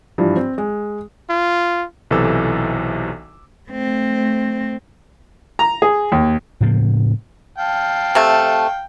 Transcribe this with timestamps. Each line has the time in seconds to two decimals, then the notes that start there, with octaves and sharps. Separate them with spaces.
0.18 G2 E3 F3
0.36 C4
0.58 G#3
1.29 F4
2.11 B1 C3 E3 A4 D6 E6
3.70 A3 C4
5.59 A#5
5.82 G#4
6.12 D#2
6.61 A2 C#3 F3 A#3
7.58 F5 G5 A5
8.15 C3 A3